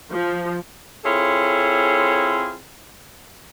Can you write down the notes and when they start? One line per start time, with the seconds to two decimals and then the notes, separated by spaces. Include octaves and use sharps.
0.12 F3
1.04 C4 E4 F4 G#4 A4 C#5